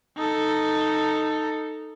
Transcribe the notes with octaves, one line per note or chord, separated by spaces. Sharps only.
D#4 A4